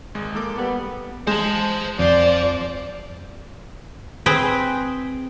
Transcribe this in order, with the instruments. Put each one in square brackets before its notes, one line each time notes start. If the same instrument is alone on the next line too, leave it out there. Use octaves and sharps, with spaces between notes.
[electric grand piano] G#1 G#3
A#3 A4 D6
[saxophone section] G3 B3
[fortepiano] G#3 [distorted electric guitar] C5 A5
[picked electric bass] F2 [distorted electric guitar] F3 C5 [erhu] D5
[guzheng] C4 G#4 B4 G5